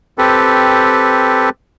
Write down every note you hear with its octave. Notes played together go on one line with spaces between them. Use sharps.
C4 G4 A4 B4